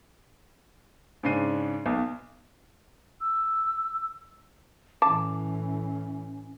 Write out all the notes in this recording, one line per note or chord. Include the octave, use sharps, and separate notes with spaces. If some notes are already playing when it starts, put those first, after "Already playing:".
G#2 C#3 D4 C7 D#7
B1
E6
A2 E3 C#4 A5 D6